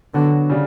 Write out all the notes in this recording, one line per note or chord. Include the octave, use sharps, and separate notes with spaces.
D3 F#3 B3 F#4
C#3 G3